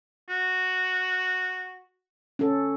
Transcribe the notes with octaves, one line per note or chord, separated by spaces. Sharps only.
F#4
C#4 A4